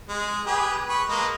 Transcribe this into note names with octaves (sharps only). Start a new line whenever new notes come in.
G#3
G4 G#4 B4
B4 C#6
G#3 A#3 D#5